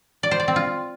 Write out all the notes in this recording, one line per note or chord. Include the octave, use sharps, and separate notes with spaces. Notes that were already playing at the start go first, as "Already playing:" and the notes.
D5
C5
D5
C4
F4